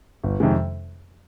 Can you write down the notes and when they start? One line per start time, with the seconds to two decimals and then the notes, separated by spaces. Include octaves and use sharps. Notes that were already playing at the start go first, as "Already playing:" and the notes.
0.24 G1
0.40 F2 C3 D#3 G#3